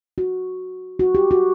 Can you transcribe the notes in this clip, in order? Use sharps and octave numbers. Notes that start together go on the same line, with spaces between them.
F#4
F#4
G4
F#4